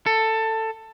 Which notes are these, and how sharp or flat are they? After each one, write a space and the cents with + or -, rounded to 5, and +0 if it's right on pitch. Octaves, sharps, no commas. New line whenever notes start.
A4 +15